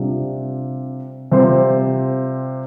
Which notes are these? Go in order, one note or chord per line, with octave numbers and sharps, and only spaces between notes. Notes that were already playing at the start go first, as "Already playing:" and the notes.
Already playing: C3 G3 D4 F4
C3 G3 C4 F4 C5